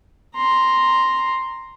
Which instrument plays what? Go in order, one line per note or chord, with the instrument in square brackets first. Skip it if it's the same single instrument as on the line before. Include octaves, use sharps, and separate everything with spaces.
[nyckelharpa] A#5 C6